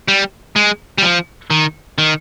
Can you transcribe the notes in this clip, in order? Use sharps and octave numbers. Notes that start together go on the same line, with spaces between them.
G3
G#3
G3
F3
D#3
D#3